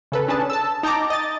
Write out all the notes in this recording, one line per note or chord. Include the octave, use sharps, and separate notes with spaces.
C#3 A4 B4
C#4 D4 G#4 B4 A5
A5 E6
D#4 G5 A5 A#5 D6
D#5 A6